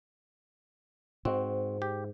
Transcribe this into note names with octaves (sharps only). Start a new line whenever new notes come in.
G#2 C4 F#4
G4